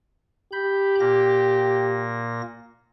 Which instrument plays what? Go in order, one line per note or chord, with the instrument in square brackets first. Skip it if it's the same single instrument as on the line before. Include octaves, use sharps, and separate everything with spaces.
[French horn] G4 [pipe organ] B5 G6
[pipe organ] A#2 A#3 A#6